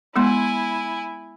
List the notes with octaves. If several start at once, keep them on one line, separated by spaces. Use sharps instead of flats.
G#3 B3 E4 G#5 C6